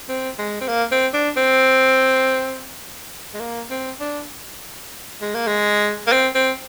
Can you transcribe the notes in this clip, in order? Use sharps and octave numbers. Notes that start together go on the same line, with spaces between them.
C4
G#3
C4
A#3
C4
D4
C4
G#3
A#3
C4
D4
G#3
A#3
G#3
A#3
C4
C4